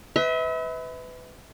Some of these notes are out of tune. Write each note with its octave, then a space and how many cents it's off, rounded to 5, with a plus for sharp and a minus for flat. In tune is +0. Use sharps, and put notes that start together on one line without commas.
B4 +25 E5 -40